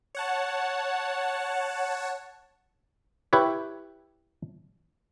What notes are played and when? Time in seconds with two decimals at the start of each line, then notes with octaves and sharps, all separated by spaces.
0.15 C#5 F#5 A5
3.33 E4 G4 B4 C#5